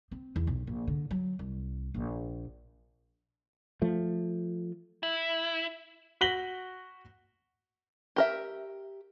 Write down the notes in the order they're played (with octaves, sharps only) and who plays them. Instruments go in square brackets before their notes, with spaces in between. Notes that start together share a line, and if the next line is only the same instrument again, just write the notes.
[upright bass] C4
E2
B1
A#1
D3
F#3
C2
A#1
[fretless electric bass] F3 A3
[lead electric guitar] E4
[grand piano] F#4 A#6 B6 F#7 G7
[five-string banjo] G4 A#4 E5